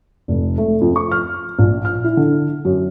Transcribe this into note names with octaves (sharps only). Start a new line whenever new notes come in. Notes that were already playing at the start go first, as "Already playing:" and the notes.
F1
A3
F2
C#6
F6
A#1
F6
E4
D3
F#2